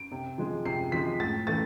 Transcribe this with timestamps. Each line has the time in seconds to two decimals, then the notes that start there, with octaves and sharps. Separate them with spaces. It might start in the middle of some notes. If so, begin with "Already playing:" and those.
Already playing: D7
0.12 C3
0.38 F3 G#3
0.65 C3 C7
0.92 F3 G#3 B6
1.20 A2 A6
1.47 E3 A3 A6